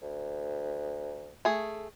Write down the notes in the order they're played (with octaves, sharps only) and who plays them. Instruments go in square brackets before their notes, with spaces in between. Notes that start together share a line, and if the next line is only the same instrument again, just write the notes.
[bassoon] D2
[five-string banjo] A3 G#4